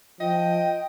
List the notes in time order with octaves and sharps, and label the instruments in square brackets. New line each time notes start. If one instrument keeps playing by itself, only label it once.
[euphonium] F3 [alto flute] F4 [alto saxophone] D#5 [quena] G5